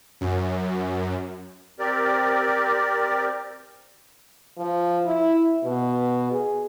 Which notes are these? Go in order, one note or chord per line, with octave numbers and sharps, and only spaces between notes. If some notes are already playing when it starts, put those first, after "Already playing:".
F#2
C4 G4 A#4 D5
F3
E4
B2
G#4